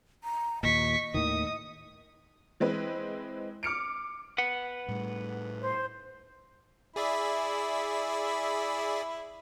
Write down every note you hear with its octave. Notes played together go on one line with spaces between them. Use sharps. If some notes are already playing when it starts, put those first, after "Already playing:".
A#5
D#2 A#2 D#5 C#6 B6
D#2 A2 D#3 D#6
E3 G#3 C4 B4
D6 F6 C#7 D7
B4 F#5
A2 G3
C5
E4 G#4 D5 E5 B5